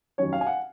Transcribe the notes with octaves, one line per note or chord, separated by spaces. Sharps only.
F1 D#2 D#3 F#3 C#4 C#5
F5
G#5
F#5